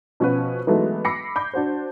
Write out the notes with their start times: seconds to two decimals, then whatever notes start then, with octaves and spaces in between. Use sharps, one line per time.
0.20 B2 F3 C#4 F#4 B4
0.67 E3 F#3 G#3 A3 B3 D#4
1.05 B5 D6 E6 A#6 C7 C#7
1.36 B5 D6 G6
1.53 D4 F#4 C5